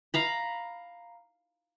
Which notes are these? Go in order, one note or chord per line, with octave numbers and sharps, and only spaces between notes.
F5 A#5 B5